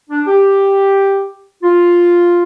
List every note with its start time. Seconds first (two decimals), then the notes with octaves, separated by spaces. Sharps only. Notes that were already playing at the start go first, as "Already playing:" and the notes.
0.10 D4
0.27 G4
1.63 F4